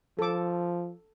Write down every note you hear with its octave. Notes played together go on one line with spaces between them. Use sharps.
F3 A4 D6